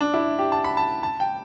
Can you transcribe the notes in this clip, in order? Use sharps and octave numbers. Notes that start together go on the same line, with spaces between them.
D4
E4
G4
A5
B5
A5
A5
G5